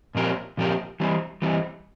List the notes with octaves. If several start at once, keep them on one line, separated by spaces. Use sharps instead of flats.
A#2 F3 C4 G4 A#4
A#2 F3 C4 G4 A#4
E3 G3 C4
E3 G3 C4